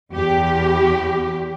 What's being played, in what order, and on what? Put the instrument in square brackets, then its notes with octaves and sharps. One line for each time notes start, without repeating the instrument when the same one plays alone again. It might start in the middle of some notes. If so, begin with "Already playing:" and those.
[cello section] E2 G4